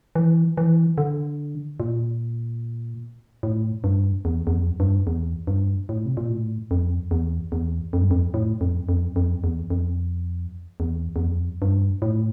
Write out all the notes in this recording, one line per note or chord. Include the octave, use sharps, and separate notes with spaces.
E3
E3
D3
A#2
A2
G2
E2
E2
F2
G2
E2
G2
A2
C3
A#2
A2
F2
E2
E2
F2
G2
F2
A2
F2
F2
F2
E2
F2
E2
E2
F2
G2
A2